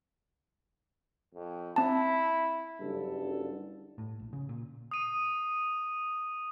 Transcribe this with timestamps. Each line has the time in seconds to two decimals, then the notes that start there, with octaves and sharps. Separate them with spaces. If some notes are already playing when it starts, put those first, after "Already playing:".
1.34 F2
1.76 C4 E4 A5
2.80 F#1 G2 D3 A4
3.98 A2
4.20 A#1
4.33 C#3
4.49 A#2
4.91 D#6 D#7